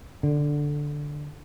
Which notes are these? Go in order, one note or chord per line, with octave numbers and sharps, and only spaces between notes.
D3